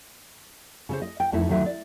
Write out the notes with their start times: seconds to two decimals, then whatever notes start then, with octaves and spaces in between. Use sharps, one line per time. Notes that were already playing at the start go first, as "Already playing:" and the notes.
0.89 C#3 A4 C5
1.02 D#5
1.20 G5
1.32 F2 A3 D#4 E4
1.49 D2 D#3 F#3 C5 E5
1.66 D5